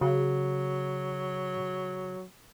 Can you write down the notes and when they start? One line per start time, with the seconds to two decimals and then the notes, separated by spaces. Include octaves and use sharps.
0.01 C#3 F#3 F#4